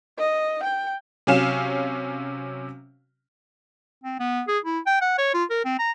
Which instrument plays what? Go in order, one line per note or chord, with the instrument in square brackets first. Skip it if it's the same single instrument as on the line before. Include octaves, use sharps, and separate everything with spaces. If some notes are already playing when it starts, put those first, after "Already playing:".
[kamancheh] D#5
G5
[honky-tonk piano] C3 F#3 C#4 F5 E7
[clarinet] C4
B3
G#4
E4
G5
F#5
C#5
F4
A#4
C4
A#5